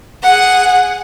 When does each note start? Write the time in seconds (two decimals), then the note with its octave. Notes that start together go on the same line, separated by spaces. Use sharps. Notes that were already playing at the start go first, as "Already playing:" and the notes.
0.23 G#4 F#5